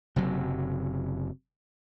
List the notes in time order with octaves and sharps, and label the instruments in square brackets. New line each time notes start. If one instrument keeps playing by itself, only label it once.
[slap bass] F#1 C3 F#3